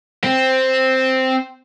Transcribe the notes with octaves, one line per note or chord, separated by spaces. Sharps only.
C4